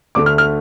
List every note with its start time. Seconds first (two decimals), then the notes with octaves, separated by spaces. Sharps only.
0.15 D2 D3 A3 D6
0.26 F6
0.38 F6